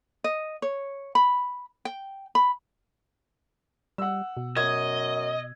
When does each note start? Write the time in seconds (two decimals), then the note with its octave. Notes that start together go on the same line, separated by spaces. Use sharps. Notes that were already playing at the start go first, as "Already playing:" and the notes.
0.24 D#5
0.62 C#5
1.15 B5
1.85 G5
2.35 B5
3.98 G3 F#5 E6
4.37 B2
4.57 F#2 D#5 G#6